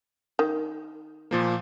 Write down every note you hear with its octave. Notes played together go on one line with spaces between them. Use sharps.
D#3
A#2 F3 A#3